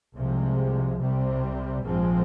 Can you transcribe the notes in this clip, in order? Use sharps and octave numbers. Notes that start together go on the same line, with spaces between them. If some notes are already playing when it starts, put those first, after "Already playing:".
C2 C3 F3 G#3
C2 C3 G3 C4
A#1 G#2 F3 G#3 C4